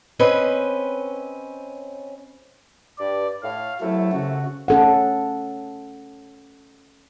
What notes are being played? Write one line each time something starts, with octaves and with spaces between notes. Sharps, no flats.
C4 C#4 B4 D#5
G2 D5
A2 F5
F#2 C3 F#3 A3 E4
C#3 F#4
C#4 A4 F#5